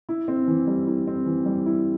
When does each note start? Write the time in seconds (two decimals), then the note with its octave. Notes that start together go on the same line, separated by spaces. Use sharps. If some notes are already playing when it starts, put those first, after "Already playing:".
0.09 E4
0.28 C4
0.47 E3
0.67 G3
0.87 E4
1.07 C4
1.26 E3
1.46 G3
1.66 E4